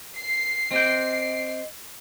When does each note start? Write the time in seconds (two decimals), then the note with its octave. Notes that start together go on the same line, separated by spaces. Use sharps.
0.16 C7
0.71 C4 G4 D#5 G5